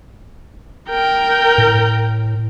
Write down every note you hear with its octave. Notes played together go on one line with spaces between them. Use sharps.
A#4 G5
A2